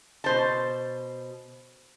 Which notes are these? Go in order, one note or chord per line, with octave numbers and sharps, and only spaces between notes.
B2 C5 A5